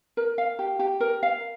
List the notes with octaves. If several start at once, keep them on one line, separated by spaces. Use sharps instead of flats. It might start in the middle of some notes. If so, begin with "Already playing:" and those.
A#4
F5
G4
G4
A#4
F5